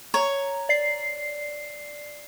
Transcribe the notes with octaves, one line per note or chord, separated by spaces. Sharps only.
C#5 A#5
D5 C7